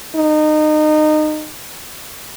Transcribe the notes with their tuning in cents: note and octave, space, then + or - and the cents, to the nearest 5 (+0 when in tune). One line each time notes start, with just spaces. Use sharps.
D#4 -25